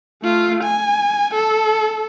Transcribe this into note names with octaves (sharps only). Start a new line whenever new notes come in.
A3 F4
G#5
A4